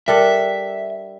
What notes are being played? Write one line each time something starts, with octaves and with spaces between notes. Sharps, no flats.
G3 D4 A4 A#4 E5